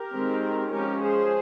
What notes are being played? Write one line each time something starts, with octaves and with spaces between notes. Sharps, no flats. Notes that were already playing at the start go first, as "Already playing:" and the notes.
Already playing: G4 A#4
D#3 G#3 C4
F3 G#3 C#4 G4 A#4
G#4 C5